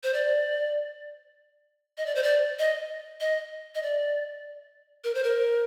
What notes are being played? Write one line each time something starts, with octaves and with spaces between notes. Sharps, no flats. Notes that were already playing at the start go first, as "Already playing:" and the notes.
C5
D5
D#5
D5
C5
D5
D#5
D#5
D#5
D5
A#4
C5
A#4